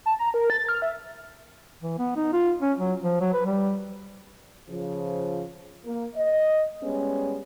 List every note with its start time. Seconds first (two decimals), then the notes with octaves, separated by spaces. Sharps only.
0.06 A5
0.19 A#5
0.34 A#4
0.50 A6
0.69 F6
0.82 E5
1.83 E3
1.98 B3
2.16 D#4
2.33 F4
2.62 C#4
2.79 F#3
3.03 F3
3.20 F#3
3.33 B4
3.46 G3
4.69 C#3 F3
5.85 A#3
6.15 D#5
6.82 G3 G#3 B3 C#4